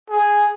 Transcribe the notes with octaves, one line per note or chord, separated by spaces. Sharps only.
G#4